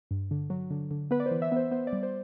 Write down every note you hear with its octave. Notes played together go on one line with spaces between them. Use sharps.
G2
D3
F#3
D3
D3
B3 B4
D5
C5
E3
E5
B3 C5
B3 C5
D5
G3
C5